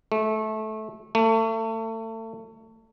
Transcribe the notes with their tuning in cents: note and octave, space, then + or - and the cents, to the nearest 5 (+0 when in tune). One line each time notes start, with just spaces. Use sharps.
A3 -20
A3 +30